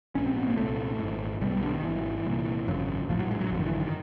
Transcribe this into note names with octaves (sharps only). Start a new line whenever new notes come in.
A#1 G#2 C#4
C4
B3
A#3
C2 A#2 A3
G#1 G#2
B1 B2 G3
G3
D3
D#3
G#1 G#2 E3
C2 A#2
G#1 F#2 C#3
A#1 A2 F3
F#3
G#3
F#3
G#1 F#2 D3 F3
D#3
E3
D#3